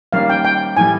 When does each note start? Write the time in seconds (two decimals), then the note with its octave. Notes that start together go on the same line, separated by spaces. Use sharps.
0.13 D#3 G3 A#3 C#4 F5
0.29 G5
0.45 G5
0.76 A2 E3 G3 G#5